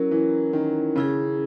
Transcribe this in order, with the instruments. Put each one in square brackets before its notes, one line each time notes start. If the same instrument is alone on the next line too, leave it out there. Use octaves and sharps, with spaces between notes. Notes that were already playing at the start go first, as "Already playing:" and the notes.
Already playing: [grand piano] F#3 [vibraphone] C#4 E4 A#4
[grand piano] E3
D#3
[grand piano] C#3 [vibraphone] C#4 E4 G#4